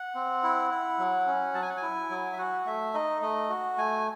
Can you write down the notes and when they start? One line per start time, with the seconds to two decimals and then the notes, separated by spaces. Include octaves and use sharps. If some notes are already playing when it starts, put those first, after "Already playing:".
Already playing: F#5
0.15 C4
0.43 E4
0.71 E4
0.99 F#3
1.27 C#4
1.54 F#3 A5
1.62 G#5
1.70 F#5
1.77 G#5
1.82 E4
2.10 F#3
2.33 E5
2.38 F#4 F#5
2.66 A3 E5
2.94 D#4 D#5
3.22 A3 D#5
3.49 F#4
3.77 A3 G#5